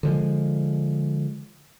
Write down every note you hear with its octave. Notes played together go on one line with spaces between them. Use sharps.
D3 F3 G#3